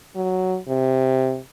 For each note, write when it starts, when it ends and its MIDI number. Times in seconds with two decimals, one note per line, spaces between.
0.16 0.57 54
0.68 1.38 48